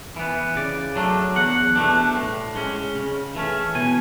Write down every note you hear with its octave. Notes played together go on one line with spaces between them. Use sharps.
E3 B3
C#3 D5
F#3 A3 D4
E2 F#5
B2 A3 D4
A2
G#3 C#4
C#3
E3 A3 C#4
B2 G#5